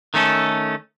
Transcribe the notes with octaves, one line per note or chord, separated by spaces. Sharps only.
D#3 A3 C#4 A4